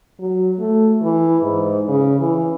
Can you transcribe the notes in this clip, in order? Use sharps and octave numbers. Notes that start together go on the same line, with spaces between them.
F#3
A3
E3
G#2
C#3
E3